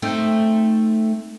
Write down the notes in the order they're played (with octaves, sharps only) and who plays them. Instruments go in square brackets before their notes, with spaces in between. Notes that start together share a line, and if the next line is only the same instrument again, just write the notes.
[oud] A3 C4 D#4